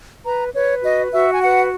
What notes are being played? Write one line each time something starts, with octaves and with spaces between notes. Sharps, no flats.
B4 A#5
B4 C#5
F#4 D#5
F#4 E5
G#5
B4 F#5